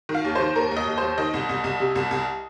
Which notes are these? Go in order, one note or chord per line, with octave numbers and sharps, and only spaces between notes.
D#3
F5
D#2
D#3 C5
D#2 A#4
D#2
D#5
D#2
D#2 C5
D#3 D#5
C2
C2
C2
C3
C2
C2